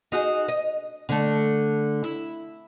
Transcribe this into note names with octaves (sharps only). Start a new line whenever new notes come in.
D#4 F#4 G#4
D#5
D3 A3
E4